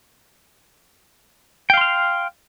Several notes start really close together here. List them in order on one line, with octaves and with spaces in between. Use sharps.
G5 F5 C6 F6